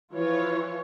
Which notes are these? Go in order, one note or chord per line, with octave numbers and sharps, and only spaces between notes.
E3 F3 F4 C#5